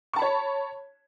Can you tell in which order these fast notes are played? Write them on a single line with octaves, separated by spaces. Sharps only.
C#6 A5 B5 C#5